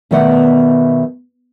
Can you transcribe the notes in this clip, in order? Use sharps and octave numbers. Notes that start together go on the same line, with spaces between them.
B2 D#3 A3 D5 F#5